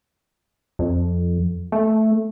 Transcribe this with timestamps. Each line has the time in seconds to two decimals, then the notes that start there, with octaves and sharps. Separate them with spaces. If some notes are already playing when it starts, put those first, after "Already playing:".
0.79 F2
1.72 A3